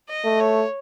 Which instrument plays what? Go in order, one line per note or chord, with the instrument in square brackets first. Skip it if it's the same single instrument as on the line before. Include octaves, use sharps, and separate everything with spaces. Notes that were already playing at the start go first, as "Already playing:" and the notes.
[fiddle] D#5
[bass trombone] A3
[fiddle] C#5